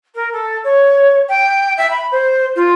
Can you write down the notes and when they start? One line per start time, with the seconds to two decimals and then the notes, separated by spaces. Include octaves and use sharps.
0.15 A#4
0.32 A4
0.64 C#5
1.29 G5
1.77 E5
1.90 B5
2.11 C5
2.55 F4